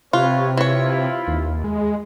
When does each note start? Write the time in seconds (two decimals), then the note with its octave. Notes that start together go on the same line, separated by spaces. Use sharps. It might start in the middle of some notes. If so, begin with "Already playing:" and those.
0.13 C3 C4 F4 B4 C#5
0.57 E3 E4 F4 C#5
1.27 D#2
1.64 G#3